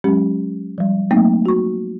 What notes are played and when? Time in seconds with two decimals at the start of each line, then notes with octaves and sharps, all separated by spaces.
0.04 F#3 G#3 C#4 G4
0.78 F3 G3
1.11 F#3 A3 A#3 C4 D#4
1.46 F#4 C#6